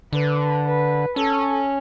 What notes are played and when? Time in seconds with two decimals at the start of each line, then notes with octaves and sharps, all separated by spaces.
0.13 D3 B4
0.65 B4
1.16 C#4 A4